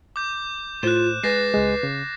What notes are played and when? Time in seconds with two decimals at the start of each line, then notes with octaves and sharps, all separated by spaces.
0.16 D6 G6
0.83 A2 F4 C5 F#6 E7
1.24 G#3 G#4 B4 A6 A#6 C7
1.54 C#2 G#3
1.83 C#3